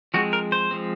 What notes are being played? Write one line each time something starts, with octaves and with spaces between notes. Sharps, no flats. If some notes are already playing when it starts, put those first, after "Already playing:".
F3 G#3 C4 F#4
A#4
C5
F3 G#3 C4